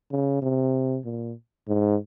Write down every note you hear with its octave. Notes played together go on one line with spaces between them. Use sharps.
C#3
C3
A#2
G#2